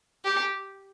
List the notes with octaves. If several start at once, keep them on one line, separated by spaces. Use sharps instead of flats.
G4